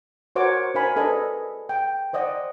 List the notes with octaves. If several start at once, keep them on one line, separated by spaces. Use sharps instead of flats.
F#4 A#4 C5 C#5 F#5 D6
D4 A#4 C5 F5 G#5 B5
D4 G#4 A4 B4 D#5
G5
C5 D5 D#5 F#5